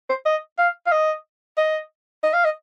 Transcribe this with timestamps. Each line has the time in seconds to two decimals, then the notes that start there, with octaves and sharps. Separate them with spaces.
0.09 C5
0.26 D#5
0.58 F5
0.86 F5
0.92 D#5
1.58 D#5
2.24 D#5
2.33 F5
2.45 D#5